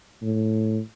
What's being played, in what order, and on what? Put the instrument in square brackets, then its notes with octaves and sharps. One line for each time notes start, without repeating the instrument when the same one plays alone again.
[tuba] A2